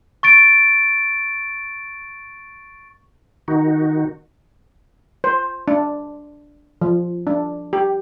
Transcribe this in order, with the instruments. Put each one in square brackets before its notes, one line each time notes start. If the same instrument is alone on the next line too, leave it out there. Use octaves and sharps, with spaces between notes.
[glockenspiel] C#6 A6 D7
[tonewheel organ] D#3 D#4 F#4
[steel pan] C5
D4
F3
D4
G4